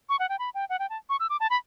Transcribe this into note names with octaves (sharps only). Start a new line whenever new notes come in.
C#6
F#5
G5
B5
G5
F#5
G5
A5
C#6
E6
D6
A5
B5